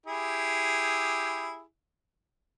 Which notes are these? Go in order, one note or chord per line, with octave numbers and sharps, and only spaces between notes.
E4 G4 G#4